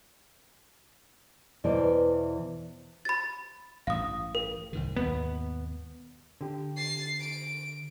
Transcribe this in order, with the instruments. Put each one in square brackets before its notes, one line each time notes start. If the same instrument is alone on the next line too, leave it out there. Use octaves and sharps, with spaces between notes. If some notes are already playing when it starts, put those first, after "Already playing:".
[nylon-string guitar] E2 B2 E3 C5 D5
[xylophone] B5 A6
[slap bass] A1 G2 [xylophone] F5 D#6
[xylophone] A#4
[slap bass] C2 G#2 D#3
[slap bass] D#2 G#2 B2 [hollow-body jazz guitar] B3
[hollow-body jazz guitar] D3 G4
[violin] A6 C7
D7